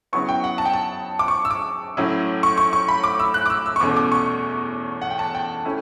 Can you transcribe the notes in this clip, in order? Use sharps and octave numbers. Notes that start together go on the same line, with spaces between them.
C#3 F#3 B3 E4 C#6
G5
F#5
A5
G5
A5
D6
C#6
E6
D6
A2 F#3 C#4 E4
C#6
C#6
C#6
B5
D6
E6
F#6
D6
E6
E6
C#6
E2 B2 A3 C#4 D6
D6
C#6
F#5
G5
A5
G5
A3 C#4 E4